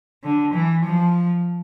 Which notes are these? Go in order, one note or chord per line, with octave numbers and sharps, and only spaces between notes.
D3
E3
F3